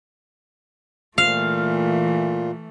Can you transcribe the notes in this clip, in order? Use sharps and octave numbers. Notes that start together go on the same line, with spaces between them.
A#2 E3 A3 F4 F5